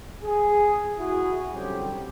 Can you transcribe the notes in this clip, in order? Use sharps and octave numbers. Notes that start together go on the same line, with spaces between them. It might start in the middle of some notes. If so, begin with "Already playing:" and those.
G#4
E4 F#4 G#4
D3 F#3 G3 C4 C#4 G4